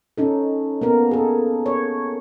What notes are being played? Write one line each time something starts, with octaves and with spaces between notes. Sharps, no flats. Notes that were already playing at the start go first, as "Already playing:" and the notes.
C#4 D#4 A4
A#3 B3 A#4
G#4 A4
C#5